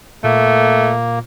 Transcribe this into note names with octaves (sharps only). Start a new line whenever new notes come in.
A#2 A3 A#3